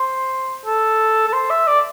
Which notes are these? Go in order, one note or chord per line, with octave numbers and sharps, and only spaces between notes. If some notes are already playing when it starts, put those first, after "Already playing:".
Already playing: C5
A4
A4
C5
E5
D5